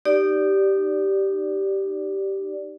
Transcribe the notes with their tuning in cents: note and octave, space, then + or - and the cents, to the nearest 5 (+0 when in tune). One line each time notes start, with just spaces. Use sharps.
D#4 -25 G4 -10 D5 +0